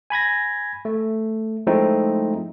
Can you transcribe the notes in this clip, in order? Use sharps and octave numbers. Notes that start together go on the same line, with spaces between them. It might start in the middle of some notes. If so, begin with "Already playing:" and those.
G#5 B5 G#6 A#6
A3
F3 G#3 A3 C4 D#4 E4